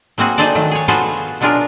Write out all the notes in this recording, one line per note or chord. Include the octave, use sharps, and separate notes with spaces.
F#3 A#3 C4 F#4 G#4
D#4 G#4 A4 C5 D5
D#3 F#3 A3
G#4 C#5
B3 F4 F#4 G#4 A4 C5
B2 F#3 D4 F4 G#4 A#4